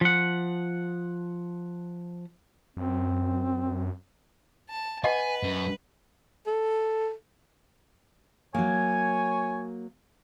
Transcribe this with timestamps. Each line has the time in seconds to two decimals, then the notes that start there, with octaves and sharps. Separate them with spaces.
0.01 F3 F#5
2.77 F#2 C4
4.70 A5
5.04 B4 D#5 F#5 G#5
5.43 F#2
6.47 A4
8.54 F#3 A#3 C#5 G#5